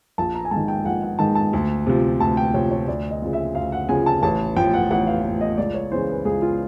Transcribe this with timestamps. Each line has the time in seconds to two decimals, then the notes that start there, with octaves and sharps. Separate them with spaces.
0.18 A#1 A5
0.35 A#5
0.45 G#5
0.51 G#2 D#3 A5
0.68 G5
0.85 A#1 F#5
1.02 F#5
1.19 G#2 D#3 A5
1.35 A5
1.53 D2
1.87 C3 F3
2.20 D2 A5
2.37 G5
2.54 C3 F3 C#5
2.71 C#5
2.88 D2 D5
3.11 D#5
3.22 C#3 F3
3.33 E5
3.55 D2 F5
3.72 F#5
3.89 C#3 F3 G#5
4.06 A5
4.23 A1 A5
4.56 A2 F3 G5
4.74 F#5
4.91 A1 F#5
5.07 F5
5.25 A2 F3
5.41 D#5
5.58 C#2 D5
5.74 C#5
5.92 C#3 E3 C5
6.09 B4
6.25 C#2 G#4
6.42 F4